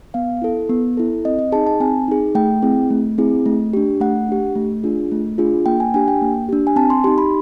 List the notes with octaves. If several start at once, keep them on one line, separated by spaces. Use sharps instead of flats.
B3 F5
E4 A4
B3
E4 A4
C4 D#5
D#5
D#4 G#4 A5
A5
C4 G#5
D#4 G#4
A3 G5
C4 E4 G#4
A3
C4 E4 G#4
A3
D4 G4
A3 F#5
D4 G4
A3
D4 F4 G#4
A3
D4 F4 G#4
A#3 G5
G#5
D4 G4 G#5
G5
A#3
D4 G4
G#5
C4 A5
C6
D#4 G4 C6
B5